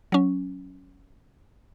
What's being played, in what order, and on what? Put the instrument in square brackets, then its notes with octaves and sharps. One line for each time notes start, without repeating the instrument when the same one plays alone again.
[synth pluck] F#3 C#4